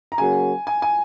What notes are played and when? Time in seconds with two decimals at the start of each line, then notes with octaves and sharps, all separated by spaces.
0.12 A#5
0.18 C#3 F#3 A#3 F#4 G#5
0.67 G#5
0.82 G#5